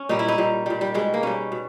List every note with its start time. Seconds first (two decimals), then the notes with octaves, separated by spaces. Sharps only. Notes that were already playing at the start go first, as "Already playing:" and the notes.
Already playing: C#4
0.09 A#2 G3 D#4
0.19 E4
0.28 D#4
0.38 A#2 G3
0.66 A#2 G3
0.81 G3
0.94 B2 G3 G#3
1.14 A#3
1.23 B2 G3 C#4
1.52 B2